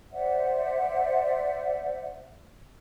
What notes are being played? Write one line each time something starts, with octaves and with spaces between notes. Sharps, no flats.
C5 D5 E5 F#5